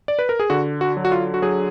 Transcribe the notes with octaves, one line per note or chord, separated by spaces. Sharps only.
D5
B4
A#4
G#4
D3 F#4
F#4
F#3
F#4
F4
F#4
F#3 G#4